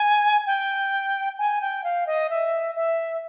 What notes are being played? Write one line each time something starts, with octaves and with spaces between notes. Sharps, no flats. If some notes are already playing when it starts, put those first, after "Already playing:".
Already playing: G#5
G5
G#5
G5
F5
D#5
E5
E5